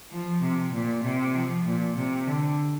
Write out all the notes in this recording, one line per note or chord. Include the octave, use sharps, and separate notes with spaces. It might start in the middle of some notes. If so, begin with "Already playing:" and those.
F3
C3
A#2
C3
F3
A#2
C3
D3